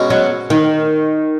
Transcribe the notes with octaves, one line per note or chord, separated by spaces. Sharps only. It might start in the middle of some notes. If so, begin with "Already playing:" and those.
Already playing: B2 G#3 C#4 F#4
F#3
D#3